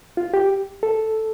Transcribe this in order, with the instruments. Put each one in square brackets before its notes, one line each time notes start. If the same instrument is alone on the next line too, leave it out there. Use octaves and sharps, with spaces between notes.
[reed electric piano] F4
G4
A4